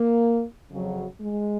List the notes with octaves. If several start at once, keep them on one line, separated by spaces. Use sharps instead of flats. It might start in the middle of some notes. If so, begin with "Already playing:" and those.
Already playing: A#3
F2 C#3 F#3
G#3